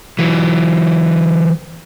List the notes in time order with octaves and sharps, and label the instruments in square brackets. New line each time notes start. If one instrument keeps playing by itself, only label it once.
[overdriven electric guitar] E3 F#3